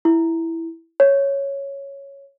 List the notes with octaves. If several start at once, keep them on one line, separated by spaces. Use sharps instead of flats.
E4
C#5